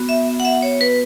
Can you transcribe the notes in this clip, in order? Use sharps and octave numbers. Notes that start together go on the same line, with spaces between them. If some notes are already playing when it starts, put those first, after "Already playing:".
Already playing: B3 F#4
E5
F#5
E5
C#5
B4